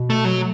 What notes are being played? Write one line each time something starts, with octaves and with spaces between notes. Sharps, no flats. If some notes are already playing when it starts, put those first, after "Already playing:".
Already playing: B2
A3
F#3